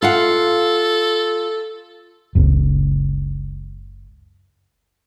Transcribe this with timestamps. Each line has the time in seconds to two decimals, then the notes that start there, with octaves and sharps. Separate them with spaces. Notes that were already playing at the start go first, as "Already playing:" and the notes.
0.02 F4 A4 F5 F#5
2.35 F#1 C#2 C#3